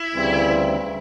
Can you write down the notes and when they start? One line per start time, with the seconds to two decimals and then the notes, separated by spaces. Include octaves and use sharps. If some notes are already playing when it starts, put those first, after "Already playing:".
Already playing: E4
0.14 D2 C#3 E3 G3 C4